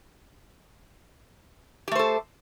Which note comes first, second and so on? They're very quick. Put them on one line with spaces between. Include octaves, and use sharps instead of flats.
G4 A3 C5 A4